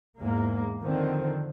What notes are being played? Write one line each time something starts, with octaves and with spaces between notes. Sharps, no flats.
E2 G#2 A#3
D3 D#3 F3 C4